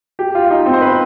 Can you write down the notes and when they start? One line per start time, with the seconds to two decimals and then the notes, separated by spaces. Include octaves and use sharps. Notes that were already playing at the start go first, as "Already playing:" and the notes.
0.19 G4
0.35 F4
0.50 D#4
0.66 C4
0.73 C5
0.82 B4